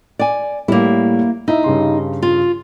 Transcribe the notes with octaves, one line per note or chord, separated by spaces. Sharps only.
D5 G#5
A2 G3 A#3 E4
D#4 E4 E5
G2 C#3 C6
F4